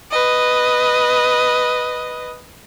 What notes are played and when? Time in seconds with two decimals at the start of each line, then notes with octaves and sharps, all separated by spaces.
0.11 B4 D#5